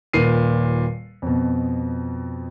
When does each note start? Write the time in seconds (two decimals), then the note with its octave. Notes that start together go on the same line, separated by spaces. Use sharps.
0.13 D#1 A#2 B4 C7 D#7
1.22 F2 B2